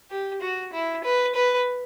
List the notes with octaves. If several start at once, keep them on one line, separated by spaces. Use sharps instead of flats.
G4
F#4
E4
B4
B4